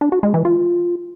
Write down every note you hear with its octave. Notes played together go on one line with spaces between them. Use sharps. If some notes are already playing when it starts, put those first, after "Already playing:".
D4
F#4
G#3
E3
F4